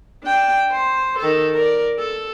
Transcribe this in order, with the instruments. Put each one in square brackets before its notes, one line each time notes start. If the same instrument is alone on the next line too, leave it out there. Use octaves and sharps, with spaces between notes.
[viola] D4 G5
C5
D#3 A4
A#4 D5
A4